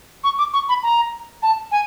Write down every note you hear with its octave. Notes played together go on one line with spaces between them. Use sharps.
C#6
D6
C#6
B5
A#5
A5
G#5